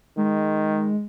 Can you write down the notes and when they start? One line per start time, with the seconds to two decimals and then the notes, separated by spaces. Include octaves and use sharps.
0.17 D#3 G#3